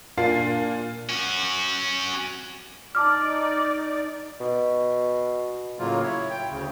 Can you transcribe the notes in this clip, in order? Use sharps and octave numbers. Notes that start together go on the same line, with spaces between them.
A#2 A#3 D4 F4 A6 C7
C#4 F#4
D#4 D5 A5 D6 F6
B2
A2 C#3 F#3 A#3 F4
E4 C#5
G5
D2 C#3